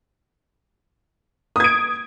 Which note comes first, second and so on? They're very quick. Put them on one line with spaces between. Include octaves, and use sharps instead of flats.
D#6 G#6 D7